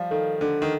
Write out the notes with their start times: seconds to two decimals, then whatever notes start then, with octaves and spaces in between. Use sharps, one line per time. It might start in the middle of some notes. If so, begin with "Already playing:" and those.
Already playing: F3 G3 F5
0.11 D#3 A4
0.41 D3 A4
0.62 D#3